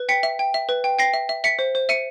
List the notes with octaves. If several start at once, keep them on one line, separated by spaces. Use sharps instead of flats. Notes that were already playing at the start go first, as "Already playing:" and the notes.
Already playing: B4
G5 B6 C#7
E5
G5
E5
B4
G5
G5 A#6 C7
E5
E5
E5 B6 C#7
C5
C5
E5 C#7 D#7